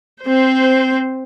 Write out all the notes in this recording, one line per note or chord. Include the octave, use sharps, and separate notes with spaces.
C4 C5